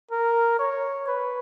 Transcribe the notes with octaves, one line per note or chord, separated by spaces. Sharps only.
A#4
C#5
B4